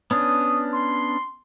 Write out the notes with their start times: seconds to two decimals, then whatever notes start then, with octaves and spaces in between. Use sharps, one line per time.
0.11 B3 C#4 D4 D#6
0.73 C6